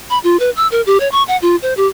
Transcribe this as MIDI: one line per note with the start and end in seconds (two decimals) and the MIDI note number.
0.10 0.18 83
0.24 0.39 65
0.40 0.50 71
0.56 0.67 88
0.72 0.81 70
0.86 1.00 67
1.00 1.08 73
1.12 1.23 85
1.28 1.37 78
1.42 1.56 65
1.62 1.74 72
1.77 1.87 67